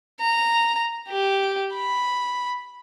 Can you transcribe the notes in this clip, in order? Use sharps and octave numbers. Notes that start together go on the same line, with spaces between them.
A#5
G4
B5